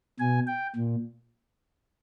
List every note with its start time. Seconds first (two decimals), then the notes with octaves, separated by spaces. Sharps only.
0.20 B2 G#5
0.47 G5
0.76 A#2